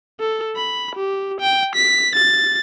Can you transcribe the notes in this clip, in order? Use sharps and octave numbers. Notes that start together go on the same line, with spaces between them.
A4
B5
G4
G5
B6
A6